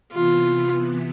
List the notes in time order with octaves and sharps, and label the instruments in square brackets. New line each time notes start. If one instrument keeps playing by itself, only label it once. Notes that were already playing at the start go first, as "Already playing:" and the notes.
[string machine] C3 E3 B3 [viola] F4